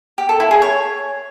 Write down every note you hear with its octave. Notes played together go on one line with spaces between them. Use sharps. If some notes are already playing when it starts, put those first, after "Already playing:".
G4
A4
E4
G#4
C#5